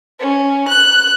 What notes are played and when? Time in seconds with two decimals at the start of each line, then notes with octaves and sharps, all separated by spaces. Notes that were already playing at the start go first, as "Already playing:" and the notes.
0.20 C#4
0.68 F#6